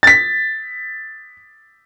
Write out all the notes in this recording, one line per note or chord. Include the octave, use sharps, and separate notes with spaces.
A6 B6